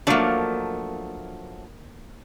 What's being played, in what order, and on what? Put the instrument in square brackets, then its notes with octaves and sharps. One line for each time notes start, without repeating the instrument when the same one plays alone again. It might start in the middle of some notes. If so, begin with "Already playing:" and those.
[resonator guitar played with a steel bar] F3 F#3 A3 [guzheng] A#3 D4